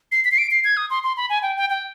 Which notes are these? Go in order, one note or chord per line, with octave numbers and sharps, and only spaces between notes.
C7
B6
C7
D7
C7
G#6
D#6
C6
C6
B5
G#5
G5
G5
G5